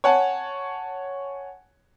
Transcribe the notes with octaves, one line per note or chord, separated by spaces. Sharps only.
C#5 F#5 G#5 A5